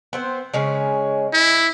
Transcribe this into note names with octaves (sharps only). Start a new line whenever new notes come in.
B3 C4 C5
C#3 G#3 C#4
E4